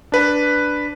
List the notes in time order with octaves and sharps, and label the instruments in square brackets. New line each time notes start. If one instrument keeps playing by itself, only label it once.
[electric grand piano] D4 B4